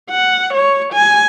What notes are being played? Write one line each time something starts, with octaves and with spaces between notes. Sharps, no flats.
F#5
C#5
G#5